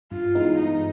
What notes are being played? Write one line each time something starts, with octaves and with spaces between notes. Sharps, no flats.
G2 F4
E3 G#3 B3 D#4
G2 D#4